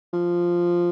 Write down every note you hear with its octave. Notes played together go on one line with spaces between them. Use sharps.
F3